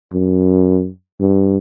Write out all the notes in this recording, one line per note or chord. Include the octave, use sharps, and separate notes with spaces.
F#2
G2